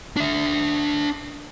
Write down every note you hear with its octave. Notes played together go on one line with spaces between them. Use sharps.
D4 E5